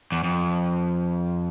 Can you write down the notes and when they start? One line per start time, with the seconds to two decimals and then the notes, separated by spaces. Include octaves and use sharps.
0.12 E2
0.24 F2